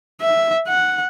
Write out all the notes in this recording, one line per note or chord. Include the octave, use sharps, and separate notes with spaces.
E5
F#5